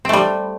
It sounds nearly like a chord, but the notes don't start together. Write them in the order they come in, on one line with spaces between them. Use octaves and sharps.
C4 A3 G3